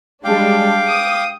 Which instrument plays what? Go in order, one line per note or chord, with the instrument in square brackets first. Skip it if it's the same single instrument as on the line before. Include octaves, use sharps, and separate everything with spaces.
[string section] G3 G#3 D4 [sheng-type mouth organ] F5 G5 D6
[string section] D#6